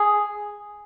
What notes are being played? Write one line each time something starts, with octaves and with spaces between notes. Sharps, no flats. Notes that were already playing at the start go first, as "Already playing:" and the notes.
Already playing: G#4